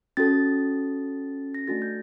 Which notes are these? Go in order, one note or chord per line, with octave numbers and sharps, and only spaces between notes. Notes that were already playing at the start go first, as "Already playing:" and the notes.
C#4 F#4 A4 A6
A#6
A3 D4 F#4 A4 A6
G6